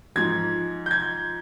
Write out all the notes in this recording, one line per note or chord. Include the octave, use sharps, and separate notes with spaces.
G#2 F3 G#6
G6
G#6